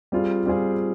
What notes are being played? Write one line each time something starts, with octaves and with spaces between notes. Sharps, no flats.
G3 C4 F4 G#4
G3 C4 F4 G#4